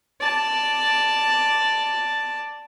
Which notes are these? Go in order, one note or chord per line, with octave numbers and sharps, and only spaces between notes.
D5 A5